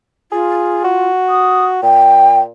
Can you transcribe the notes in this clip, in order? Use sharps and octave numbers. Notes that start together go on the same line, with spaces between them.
F4 G#4
F#4
D#6
A#2 G5